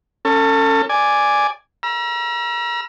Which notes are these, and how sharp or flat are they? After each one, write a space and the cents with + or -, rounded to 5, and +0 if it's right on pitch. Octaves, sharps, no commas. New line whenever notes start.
C#4 +0 A4 +30
D5 +0 G#5 +0
A#5 +40 E6 +40